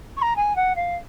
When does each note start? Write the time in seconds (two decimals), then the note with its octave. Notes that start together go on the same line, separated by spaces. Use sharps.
0.17 C#6
0.22 A#5
0.36 G#5
0.56 F#5
0.76 F5